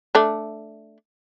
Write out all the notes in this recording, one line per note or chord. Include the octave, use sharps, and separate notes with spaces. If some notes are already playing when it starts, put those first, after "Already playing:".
A3 D4